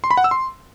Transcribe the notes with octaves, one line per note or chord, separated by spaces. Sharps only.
C6
B5
F#5
E6
C6